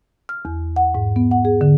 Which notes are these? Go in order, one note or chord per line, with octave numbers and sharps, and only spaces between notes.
F6
E2
F#5
G#2
B3
F#5
G#4
D3